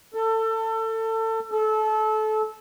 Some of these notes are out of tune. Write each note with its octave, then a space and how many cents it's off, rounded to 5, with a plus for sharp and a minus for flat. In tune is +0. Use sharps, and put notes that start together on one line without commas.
A4 +25
A4 -25